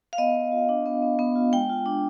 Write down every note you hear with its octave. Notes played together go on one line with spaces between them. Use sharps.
F5
B3 D#5
B3
F4
D4
B3
B3
B3
F4
G#3 G5
F4
D4